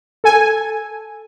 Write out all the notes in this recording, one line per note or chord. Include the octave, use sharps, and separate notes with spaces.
A4 G#5